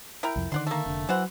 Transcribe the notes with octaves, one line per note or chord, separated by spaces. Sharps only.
E4 A#4 G5
C2 F2
D3 D#3 D5 F#5 C6
A3 A#3
F1 D3
E3 F#3 C5 F#5